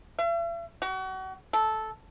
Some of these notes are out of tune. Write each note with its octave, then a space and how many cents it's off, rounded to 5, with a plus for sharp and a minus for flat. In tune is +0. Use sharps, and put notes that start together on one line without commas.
E5 +45
F#4 +35
A4 -10